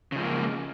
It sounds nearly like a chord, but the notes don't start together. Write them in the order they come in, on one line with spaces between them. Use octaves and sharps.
C#3 F3 G#3 A#3